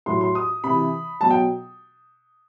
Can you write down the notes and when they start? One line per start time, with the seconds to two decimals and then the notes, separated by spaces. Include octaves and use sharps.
0.06 A2 F#3 C6
0.21 C6
0.35 D#6
0.64 C3 E3 B5
1.21 B2 F#3 A5
1.30 G5